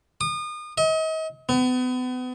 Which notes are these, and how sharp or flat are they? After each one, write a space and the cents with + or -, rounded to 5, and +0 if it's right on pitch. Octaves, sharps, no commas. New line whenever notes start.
D#6 -35
D#5 +40
B3 +35